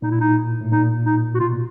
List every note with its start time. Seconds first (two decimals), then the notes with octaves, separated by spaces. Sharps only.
0.02 A#2 D#4
0.11 E4
0.21 D#4
0.61 A2
0.71 A#2 D#4
1.06 D#4
1.35 F#4
1.40 B2 F4
1.53 A#2